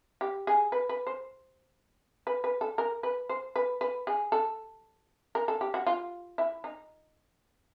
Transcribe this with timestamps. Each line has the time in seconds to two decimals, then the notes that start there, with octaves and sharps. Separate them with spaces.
0.21 G4
0.47 G#4
0.72 B4
0.89 B4
1.07 C5
2.27 B4
2.44 B4
2.61 A4
2.78 A#4
3.03 B4
3.29 C5
3.56 B4
3.81 B4
4.07 G#4
4.32 A4
5.35 A#4
5.48 A4
5.61 G4
5.74 F#4
5.87 F4
6.38 E4
6.64 D#4